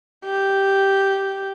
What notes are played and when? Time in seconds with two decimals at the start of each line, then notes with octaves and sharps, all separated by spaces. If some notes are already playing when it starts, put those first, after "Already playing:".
0.25 G4